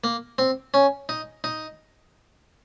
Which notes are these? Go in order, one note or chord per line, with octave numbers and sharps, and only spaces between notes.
A#3
C4
C#4
D#4
D#4